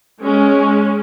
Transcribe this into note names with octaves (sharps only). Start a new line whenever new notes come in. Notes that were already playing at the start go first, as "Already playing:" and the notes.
G#3 C#4